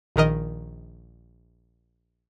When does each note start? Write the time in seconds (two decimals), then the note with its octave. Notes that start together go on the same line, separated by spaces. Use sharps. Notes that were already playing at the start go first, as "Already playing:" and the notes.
0.16 A#1 D#3 A#4 D#5